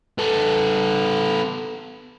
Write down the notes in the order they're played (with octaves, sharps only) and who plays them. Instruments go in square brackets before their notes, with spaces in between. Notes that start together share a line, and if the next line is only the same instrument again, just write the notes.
[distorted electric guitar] B3 A4